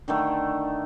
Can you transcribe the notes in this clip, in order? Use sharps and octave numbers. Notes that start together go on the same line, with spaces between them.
D3 D#3 A3